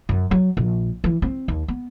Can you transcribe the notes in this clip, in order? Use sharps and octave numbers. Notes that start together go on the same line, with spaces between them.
F#2
F#3
A#1
E3
C4
D#2
B3